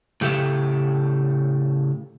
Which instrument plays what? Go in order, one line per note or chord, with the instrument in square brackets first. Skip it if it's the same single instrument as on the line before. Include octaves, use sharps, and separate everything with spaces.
[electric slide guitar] A2 C#3 G4 A4 E5